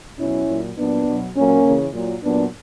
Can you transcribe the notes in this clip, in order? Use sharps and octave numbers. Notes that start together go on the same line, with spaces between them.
B2 F#3 C#4 E4
A#2 F#3
A#2 F#3 B3 D4
B2 F#3
A#2 F#3 A#3 C#4
C#3 E3
A#2 F#3
A#2 F#3 B3 D4